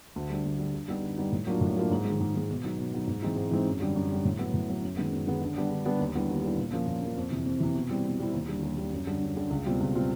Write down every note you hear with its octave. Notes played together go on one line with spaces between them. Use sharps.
D2
D3 G3
D2
D3 G3
D3
G3 B3 D#4
D3
G3 B3 D#4
A2
F#3 A#3 D4 F4
A2
F#3 A#3 D4 F4
G#2
G#3
D#3
G#2
D#3 G#3
B2
F#3 B3 D#4
B2
F#3 B3 D#4
G#2
E3 G#3 C4 D#4
G#2
E3 G#3 C4 D#4
F#2
D3 G3
F#2
D3 G3
A2
F#3 B3
A2
F#3 B3
F#2
D#3 G#3 B3
F#2
D#3 G#3 B3
D3
G3 B3 D4
D3
G3 B3 D4
D#2
D3 G3 B3 E4
D#2
D3 G3 B3 E4
A#2
F3 A#3 C#4
A#2
F3 A#3 C#4
F2
C3 E3
F2
C3 E3
B2
G3 C4 E4
B2
G3 C4 E4
D#2
D3 G3
D#2
D3 G3
F#2
D3 G3
F#2
D3 G3
C#2
B2 G3 C4 F4
C#2
B2 G3 C4 F4